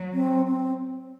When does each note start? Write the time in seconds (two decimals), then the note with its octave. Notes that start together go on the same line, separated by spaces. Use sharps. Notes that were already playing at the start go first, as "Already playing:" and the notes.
Already playing: F#3
0.13 C4
0.46 C4